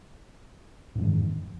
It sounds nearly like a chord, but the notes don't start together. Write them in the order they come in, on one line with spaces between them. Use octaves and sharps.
G#2 F2 F3 D#3